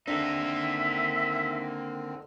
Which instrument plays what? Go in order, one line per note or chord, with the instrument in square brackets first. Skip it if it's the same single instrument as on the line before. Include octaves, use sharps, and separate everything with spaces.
[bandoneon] D3 D#3 C4 [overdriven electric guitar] A#3 D#4 [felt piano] D4 [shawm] E5